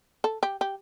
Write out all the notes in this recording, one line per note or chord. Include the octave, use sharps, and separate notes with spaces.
A4
G4
G4